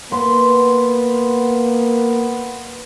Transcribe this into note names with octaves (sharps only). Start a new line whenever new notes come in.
A#3 B3 B4 C6